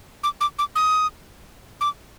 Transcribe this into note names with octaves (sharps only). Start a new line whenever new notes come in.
D6
D6
D6
D#6
D6